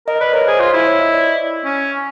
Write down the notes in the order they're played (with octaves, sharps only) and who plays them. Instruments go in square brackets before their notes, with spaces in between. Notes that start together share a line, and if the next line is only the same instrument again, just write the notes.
[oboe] A#4 [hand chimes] D#5
[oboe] B4 [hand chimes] D5
[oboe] A#4 [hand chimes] C#5
[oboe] G#4 [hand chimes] C5
[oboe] F4
E4
[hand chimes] C#5
D#5
D5
[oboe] C#4